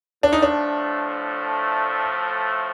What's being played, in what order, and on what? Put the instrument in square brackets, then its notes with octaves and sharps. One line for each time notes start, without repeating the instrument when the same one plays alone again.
[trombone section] A2 F3 A3 [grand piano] D4
[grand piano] D#4
D4